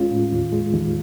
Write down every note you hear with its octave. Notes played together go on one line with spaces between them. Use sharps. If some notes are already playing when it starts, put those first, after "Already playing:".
Already playing: D#2 G#3 C#4 F4
A2
D#2
G#3
D#2